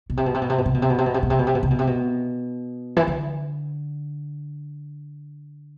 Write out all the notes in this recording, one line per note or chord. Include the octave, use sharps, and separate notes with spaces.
B2
C3
B2
C3
B2
C3
B2
C3
B2
C3
B2
C3
B2
C3
B2
C3
B2
C3
B2
C3
B2
C3
B2
E3
D3